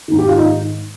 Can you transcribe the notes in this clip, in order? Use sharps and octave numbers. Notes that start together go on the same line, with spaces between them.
G#2 D#3
G4
F4
D#4